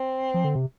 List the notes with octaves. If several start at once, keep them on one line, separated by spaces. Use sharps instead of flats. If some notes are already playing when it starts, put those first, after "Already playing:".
Already playing: C4
F3
D3
C3